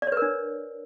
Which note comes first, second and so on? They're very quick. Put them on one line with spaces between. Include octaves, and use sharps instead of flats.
D5 C#5 B4 A#4 D4